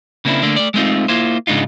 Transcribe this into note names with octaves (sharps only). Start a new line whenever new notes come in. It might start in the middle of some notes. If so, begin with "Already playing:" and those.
C#3 A#3 C4 D4 E4
D3 A3 A#3 D4
A3 D5
G#3 A3 C4 D#4 F4
A#3 E4 F4 C5
G#2 C#3 G#3 D4 D#4 F4